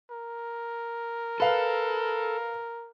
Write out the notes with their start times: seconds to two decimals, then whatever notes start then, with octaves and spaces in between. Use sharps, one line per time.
0.10 A#4
1.40 A4 B4 F5